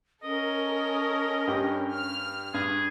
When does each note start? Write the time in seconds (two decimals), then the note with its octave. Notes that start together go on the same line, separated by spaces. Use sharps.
0.23 C#4 A4 A#4 D#5
1.47 G2 G4
1.95 F6
2.54 G2 G#4